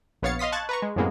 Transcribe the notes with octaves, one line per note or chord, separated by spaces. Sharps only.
A#1 B3 C#5 F5 A6 C#7
D#5 F5 C6 D#6 B6
A5 C#6 F#6 G#6 A6
B4 A#5 C#6
G#3
F#2 A2 C3 G#3 A#3 B3